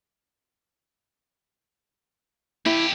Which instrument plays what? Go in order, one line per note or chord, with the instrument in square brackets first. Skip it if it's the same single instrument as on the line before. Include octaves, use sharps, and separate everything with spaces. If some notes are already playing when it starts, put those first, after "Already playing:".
[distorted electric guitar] F2 G4 [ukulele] E4